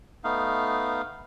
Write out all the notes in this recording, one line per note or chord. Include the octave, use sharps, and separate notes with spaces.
A3 B3 D#4 F5